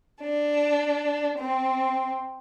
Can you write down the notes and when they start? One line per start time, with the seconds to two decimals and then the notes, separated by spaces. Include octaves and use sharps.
0.22 D4
1.39 C4